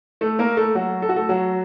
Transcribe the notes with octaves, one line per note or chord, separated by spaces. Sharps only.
A3 A4
A#3 A#4
A3 A4
F#3 F#4
A4
F#4
A3 A4
F#3 F#4